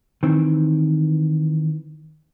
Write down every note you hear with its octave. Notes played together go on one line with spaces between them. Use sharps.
D#3 E3 C4